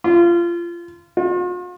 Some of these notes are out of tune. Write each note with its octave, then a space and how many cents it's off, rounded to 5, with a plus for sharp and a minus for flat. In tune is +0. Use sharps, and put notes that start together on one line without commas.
F4 -25
F4 +45